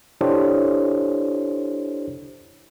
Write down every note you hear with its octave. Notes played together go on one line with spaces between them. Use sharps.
D4 E4 G4 A4 C5 C#5